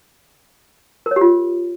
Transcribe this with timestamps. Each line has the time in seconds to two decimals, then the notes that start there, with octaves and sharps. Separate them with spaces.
1.06 A#4
1.11 C#5
1.16 G4
1.21 F4